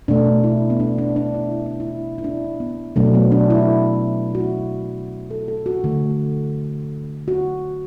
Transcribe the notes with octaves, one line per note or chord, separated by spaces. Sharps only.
B2 A3 D4
E4
B3
D4
D4
D4
E4
E4
D4
E4
E4
D4
B3
B2 F#3 A3 D4
B3
D4
E4
F#4
E4
A4
A4
F#4
D3 A3
F#4